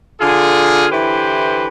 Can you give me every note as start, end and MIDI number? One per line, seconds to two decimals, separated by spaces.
0.20 0.85 50
0.20 0.85 65
0.20 0.85 68
0.91 1.68 50
0.91 1.68 52
0.91 1.68 64
0.91 1.68 67
0.91 1.68 71
0.91 1.68 72